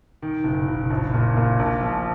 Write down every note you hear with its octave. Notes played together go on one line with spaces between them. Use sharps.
D#3
F#1
F#1
A#1
A#2
A#2
A#1
F3